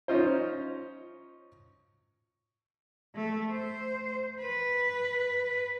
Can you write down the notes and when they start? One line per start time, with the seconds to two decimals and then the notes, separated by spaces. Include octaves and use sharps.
0.08 C#4 D#4 F4 C5
3.15 A3
3.52 C5
4.40 B4